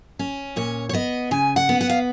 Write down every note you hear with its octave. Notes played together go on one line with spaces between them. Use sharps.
C#4
A#2 C#5
C#5
B3 D#5
C#3 G#5
F#5
B3
F#5
F5